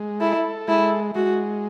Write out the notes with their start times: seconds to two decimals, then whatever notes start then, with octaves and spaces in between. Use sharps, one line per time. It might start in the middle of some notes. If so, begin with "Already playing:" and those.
Already playing: G#3
0.20 E4 A4
0.68 G#3 E4
1.15 G#3 F#4